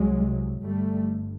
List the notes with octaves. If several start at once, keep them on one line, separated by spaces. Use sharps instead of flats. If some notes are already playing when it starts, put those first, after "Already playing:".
Already playing: C2 C3 F#3 G#3
G1 G2 G3 A3